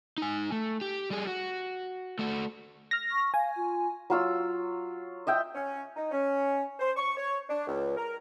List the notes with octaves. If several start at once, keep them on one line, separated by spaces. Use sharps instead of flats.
D#4 G#5
A3
G4
G3 G#4
F#4
A3 F#4
F6 A#6
C#6
F5 G#5
F4
F#3 F4 E6
D#5 E5 G5
C#4
D#4
C#4
C5
C#6
C#5
D4
C#2
A#4